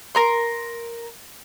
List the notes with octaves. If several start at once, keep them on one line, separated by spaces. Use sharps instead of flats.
A#4 A#5 C6